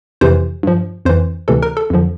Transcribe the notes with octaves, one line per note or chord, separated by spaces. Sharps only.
F2 C3 E3 C5
G2 F3
F2 E3 C5
D2 C3 E3 A4
A#4
A4
F2 D3 F3